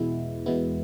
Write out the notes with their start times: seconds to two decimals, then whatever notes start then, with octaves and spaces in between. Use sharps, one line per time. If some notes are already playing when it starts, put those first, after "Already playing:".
Already playing: E2 B2 G#3 B3 E4
0.46 E2 B2 G#3 B3 E4